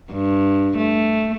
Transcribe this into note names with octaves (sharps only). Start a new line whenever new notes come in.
G2
A3